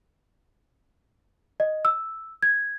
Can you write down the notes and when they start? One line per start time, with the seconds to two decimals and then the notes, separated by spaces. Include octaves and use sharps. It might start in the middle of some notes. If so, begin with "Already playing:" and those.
1.60 D#5
1.85 E6
2.42 G#6